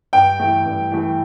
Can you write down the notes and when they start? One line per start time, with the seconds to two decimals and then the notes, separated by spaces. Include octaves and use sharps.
0.13 G2 G5
0.40 E3 A3
0.66 G2
0.92 E3 A3